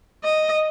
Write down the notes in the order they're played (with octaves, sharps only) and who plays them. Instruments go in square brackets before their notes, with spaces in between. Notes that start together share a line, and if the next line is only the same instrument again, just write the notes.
[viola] D#5